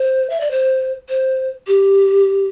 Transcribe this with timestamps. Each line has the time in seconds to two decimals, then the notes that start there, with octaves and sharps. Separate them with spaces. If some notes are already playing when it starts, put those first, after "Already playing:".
Already playing: C5
0.30 E5
0.41 D5
0.51 C5
1.09 C5
1.67 G4